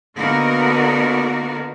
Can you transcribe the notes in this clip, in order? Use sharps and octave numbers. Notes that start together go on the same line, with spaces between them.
D3 A#3 B3 D#4 F#4 A#4